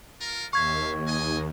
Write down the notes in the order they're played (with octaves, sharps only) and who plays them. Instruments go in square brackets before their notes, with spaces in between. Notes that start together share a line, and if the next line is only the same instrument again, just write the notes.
[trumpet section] F4 A#4
[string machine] D#2 [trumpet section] E5 F5 [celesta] C#6 G#6
[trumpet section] D#5 G#5